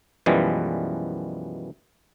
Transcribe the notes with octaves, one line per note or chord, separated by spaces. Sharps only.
F#2 B2 E3 F3 G3 G#3